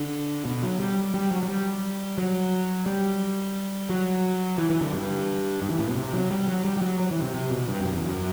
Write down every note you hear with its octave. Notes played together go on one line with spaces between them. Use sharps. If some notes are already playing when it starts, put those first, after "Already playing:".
Already playing: D3
B2
F#3
G3
G3
F#3
F#3
G3
F#3
G3
F#3
E3
E3
D3
G2
G2
E3
A2
B2
C3
F#3
G3
F#3
G3
G3
F#3
F#3
E3
C3
C3
B2
G2
F#2
E2
F#2